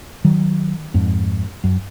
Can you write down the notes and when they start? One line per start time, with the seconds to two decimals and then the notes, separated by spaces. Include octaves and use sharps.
0.25 D#3 F#3
0.94 F2 G#2
1.64 F#2